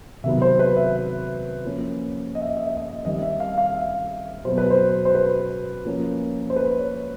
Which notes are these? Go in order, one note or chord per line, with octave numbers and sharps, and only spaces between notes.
C3 D#3 F#3 B3 E5
C5
B4
E5
F3 A#3 C#4
D#5
E5
D#5
E5
D#5
E5
D#5
D#3 G3 C4 D#5
E5
F5
F5
E5
B2 F#3 B3 C5
B4
C5
C5
B4
F3 A#3 C#4
C5
B4
C#5